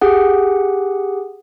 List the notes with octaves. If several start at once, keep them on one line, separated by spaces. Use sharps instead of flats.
G4 G#4 F#5